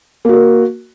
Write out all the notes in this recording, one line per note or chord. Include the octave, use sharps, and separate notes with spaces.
A#3 F#4 A#4